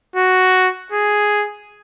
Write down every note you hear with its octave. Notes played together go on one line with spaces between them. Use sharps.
F#4
G#4